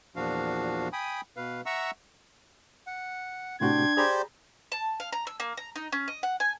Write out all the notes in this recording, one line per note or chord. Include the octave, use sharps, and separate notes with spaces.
E2 A#2 F3 D4 F#4 F5
G5 G#5 B5 D#6
B2 B4 F5
E5 F#5 A#5 C#6 E6
F#5
A2 C3 D4 F#4 G5 C6 G#6
G4 G#4 C5 D5 A#5 B5
A5
F5
A#5
E6
A#3
A#5
D#4
C#4
D#5
F#5
G#5